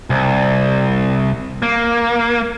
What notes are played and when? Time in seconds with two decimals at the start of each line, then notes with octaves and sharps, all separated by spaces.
0.10 C2
1.62 A#3